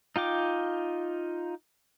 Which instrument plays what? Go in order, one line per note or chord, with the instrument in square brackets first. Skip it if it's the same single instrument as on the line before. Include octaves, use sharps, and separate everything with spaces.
[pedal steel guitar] D#4 F4 G5 D6